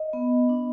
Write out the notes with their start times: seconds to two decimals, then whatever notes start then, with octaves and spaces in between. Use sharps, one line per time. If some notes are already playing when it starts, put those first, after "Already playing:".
Already playing: D#5
0.13 B3
0.49 D4